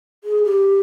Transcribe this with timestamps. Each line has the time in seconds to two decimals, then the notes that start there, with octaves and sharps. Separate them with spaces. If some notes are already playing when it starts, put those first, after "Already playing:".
0.24 G#4
0.44 G4